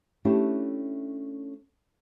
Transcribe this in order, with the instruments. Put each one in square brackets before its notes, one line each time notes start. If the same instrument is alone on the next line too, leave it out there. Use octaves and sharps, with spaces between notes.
[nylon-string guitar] A3 C#4 D4 E4 G4